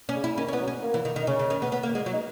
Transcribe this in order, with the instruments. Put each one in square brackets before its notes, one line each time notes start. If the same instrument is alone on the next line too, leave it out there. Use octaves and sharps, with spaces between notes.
[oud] C#4
[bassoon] C#3
[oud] E4
[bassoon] D#3 [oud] C#4
[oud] C#4
B3
[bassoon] F#3
[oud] C#4
[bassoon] A#3
[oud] E3
D#3
D#3
[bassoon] D#4
[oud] C#3 [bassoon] C#4
[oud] C#3
D#3
B3
B3
A#3
G#3
F#3
[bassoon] D#4